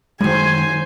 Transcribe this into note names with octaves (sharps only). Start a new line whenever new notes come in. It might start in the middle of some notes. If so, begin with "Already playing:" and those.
F#2 D#3 G#3 C5 G#5